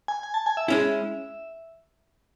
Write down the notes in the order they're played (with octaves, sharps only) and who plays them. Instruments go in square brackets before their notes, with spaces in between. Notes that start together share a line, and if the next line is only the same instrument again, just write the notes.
[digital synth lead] G#5
G#5
A5
G#5
E5
[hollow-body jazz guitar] G#3 C#4 E4